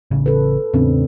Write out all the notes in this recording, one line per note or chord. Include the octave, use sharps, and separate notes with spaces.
A1 C#3
A4 B4
E2 A2 C#3 C4 D4